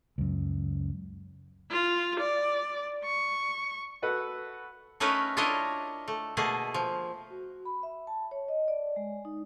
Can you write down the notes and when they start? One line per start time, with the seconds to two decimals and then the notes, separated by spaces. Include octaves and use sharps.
0.18 C#2 F#2
1.71 F4
2.20 D5
3.04 C#6
4.02 F#4 A4 B4 F#5
5.00 A3 C#4 D#4 A#4 B4 C#5
5.37 D4 E4 F4 A#4 C#5 D#5
6.08 A3
6.37 B2 A3 A#3 G#4
6.74 F3
7.30 F#4
7.65 B5
7.83 E5
8.07 A5
8.31 C#5
8.48 D#5
8.68 D5
8.96 G#3
9.25 D#4